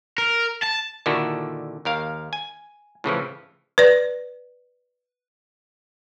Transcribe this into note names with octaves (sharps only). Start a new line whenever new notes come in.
A#4
A5
A#2 D3 D#3 E4 F#4 A4
D#2 A#4 F5
G#5
A2 C#3 E3 F3
B4 D5